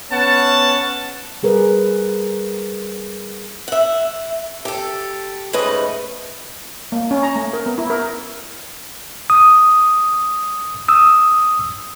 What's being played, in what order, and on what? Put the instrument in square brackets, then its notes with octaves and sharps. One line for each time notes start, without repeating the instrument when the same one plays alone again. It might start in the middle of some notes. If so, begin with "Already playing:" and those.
[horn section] B3 C#4 F#5 A5
[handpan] G3 G#4 A#4 B4
[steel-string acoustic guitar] E5 F#5
G4 A4
G#2 C#3 A3 B4 D#5
[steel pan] A#3
C#4
A#5
A3
A#4
B3
E4
A#4
[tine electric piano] D#6
D#6 E6